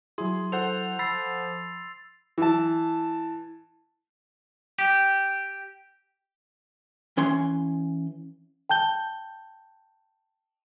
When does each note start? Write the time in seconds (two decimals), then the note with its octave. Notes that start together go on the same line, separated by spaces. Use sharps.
0.18 F#3 E4 G#4 C6
0.52 A4 C5 F#5 F7
0.99 F3 B5 E6 A6 C7
2.38 E3 A5
4.79 G4
7.17 E3 C#4 G#5 C6
8.69 G5 A5 G6 G7